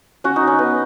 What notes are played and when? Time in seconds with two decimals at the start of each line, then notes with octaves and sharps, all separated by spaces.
0.24 C#4 F#4
0.36 D#4
0.47 C#4
0.59 B3